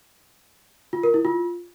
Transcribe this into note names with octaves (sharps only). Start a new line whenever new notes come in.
F4
A#4
E4
F4